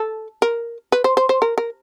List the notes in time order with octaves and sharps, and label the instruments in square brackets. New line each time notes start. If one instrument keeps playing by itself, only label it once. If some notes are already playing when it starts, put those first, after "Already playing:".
Already playing: [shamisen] A4
A#4
B4
C5
C5
C5
A#4
A#4